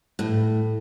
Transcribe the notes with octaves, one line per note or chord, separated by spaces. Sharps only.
A2